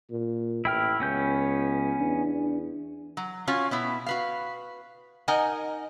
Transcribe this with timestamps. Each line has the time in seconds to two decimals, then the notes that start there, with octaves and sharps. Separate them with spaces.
0.10 A#2
0.65 A1 E4 G5 F6
1.00 C#2 B3 C#4 G6
2.00 E2 D4
3.17 F#3
3.47 C#4 F4 F#4 C#5 F5
3.71 B2 B3 E4
4.06 F#4 B4 F5
5.28 D#4 A#4 D#5 F#5 G#5